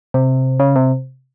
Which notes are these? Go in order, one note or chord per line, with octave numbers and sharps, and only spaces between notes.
C3
C#3
C3